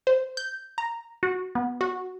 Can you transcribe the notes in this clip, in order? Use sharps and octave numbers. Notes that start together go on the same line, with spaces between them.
C5
G6
A#5
F#4
B3
F#4